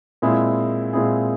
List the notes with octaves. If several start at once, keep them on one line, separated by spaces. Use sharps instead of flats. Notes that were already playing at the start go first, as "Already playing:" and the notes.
A#2 G#3 C4 E4 G#4
A#2 G#3 C4 E4 G#4